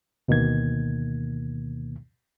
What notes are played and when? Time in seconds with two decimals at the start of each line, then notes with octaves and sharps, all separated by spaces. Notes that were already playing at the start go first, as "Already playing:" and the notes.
0.28 D2 B2 D#3 A#3 G#6